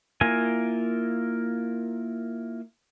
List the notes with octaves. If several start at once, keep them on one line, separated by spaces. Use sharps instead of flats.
A#3 E4 F4 A#4 G#5